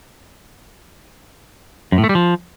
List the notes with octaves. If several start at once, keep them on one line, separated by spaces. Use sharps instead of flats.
F#2
A2
A3
G3
F3